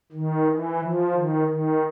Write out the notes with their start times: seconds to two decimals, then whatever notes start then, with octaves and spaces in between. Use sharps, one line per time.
0.12 D#3
0.46 E3
0.80 F3
1.13 D#3
1.48 D#3